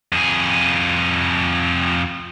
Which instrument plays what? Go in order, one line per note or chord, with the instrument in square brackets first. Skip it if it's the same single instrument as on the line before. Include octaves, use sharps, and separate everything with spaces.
[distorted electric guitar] F2 G#4